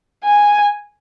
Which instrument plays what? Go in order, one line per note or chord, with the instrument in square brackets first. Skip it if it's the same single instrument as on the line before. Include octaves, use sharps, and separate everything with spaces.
[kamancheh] G#5